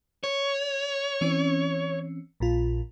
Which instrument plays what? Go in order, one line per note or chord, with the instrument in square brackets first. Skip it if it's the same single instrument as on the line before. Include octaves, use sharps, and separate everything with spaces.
[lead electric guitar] C#5
[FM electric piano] E3 C4 C#4
A#1 A#2 F4